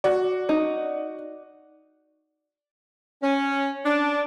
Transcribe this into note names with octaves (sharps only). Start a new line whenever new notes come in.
F#4 D5
D#4
C#4
D4